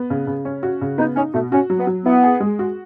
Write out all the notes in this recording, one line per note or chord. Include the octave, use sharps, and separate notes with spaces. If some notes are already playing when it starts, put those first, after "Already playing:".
Already playing: B3
C#3
C#3
C#4
F#4
C#3
B3 D#4
C#4 D#4
B2 A3
C#4 F#4
F#3
B3
F#3
B3 E4
G#4
G#3
F#4